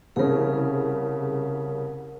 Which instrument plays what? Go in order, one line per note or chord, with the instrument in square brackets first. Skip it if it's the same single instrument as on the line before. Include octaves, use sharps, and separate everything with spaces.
[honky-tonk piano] C2 C#3 [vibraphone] G#4 A#4